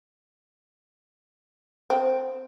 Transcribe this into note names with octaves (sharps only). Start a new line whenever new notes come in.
C4